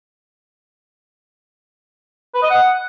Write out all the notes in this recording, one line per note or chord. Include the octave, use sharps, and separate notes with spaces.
B4
D#5
F#5